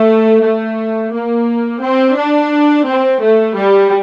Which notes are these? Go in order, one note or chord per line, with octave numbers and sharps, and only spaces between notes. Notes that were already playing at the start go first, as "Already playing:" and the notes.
Already playing: A3
A3
A#3
C4
D4
C4
A3
G3